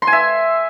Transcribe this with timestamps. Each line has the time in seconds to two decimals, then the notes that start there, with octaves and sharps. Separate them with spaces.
0.02 C6
0.07 G#5
0.13 E5